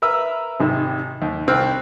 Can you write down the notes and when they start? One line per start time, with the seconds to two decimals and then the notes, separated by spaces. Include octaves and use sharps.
0.02 A#4 B4 E5 E6
0.60 G#1 C3 D#3
1.22 D#2
1.47 C2 C4 F6 F#6